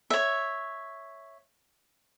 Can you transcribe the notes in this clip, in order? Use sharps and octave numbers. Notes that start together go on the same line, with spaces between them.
C#5 E5